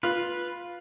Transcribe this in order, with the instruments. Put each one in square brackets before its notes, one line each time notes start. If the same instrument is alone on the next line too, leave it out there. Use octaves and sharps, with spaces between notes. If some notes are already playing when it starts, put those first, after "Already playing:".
[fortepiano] F4 [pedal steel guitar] B4